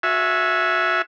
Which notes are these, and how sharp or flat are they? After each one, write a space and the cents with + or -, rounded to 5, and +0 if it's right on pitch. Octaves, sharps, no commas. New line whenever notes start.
F#4 -25 E5 +0 G#5 +15